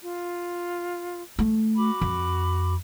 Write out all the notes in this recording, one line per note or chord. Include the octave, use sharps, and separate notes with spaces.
F4
A3
F#4 B5 D6
F2